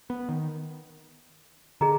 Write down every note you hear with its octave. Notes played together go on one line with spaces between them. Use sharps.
B3
D#3
D3 G#4 D#5 A#5